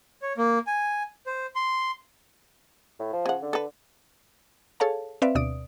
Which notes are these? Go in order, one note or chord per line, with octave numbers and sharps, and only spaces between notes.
C#5
A#3
G#5
C5
C6
A2
F3
C#3 F#5
D3
A4 B4
G#4 A4 C#5 F5 A5
C4 B4 D5 E5 F5
D2 B2 D5 D#6 D7